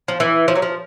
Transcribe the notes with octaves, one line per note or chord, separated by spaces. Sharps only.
F3
E3
F3
F#3
F3